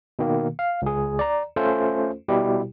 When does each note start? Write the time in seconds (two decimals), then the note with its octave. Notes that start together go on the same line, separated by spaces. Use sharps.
0.19 B2 D#3 A#3
0.59 F5
0.82 C#2 G#4
1.19 D5 A#5
1.56 A3 C#4 F4 A4 C5
2.28 B2 G3 E4 G4